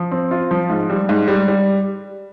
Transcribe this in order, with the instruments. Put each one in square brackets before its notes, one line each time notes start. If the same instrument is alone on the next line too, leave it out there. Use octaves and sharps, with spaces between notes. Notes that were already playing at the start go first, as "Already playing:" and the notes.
Already playing: [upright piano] F3
C4
F4
F3
G#2
G3
G#2
G3
G3